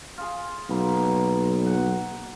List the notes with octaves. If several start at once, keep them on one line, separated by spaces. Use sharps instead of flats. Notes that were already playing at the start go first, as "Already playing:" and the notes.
F4 G#4
B1 B2 A#3 B5
F#5